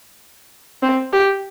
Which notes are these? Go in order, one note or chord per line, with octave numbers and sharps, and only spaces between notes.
C4
G4